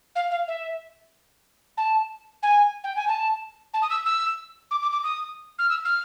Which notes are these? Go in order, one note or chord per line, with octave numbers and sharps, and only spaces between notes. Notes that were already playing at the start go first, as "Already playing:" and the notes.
F5
F5
E5
A5
G#5
G5
G#5
A5
A5
D#6
E6
E6
D6
D6
D6
D#6
F6
E6
F6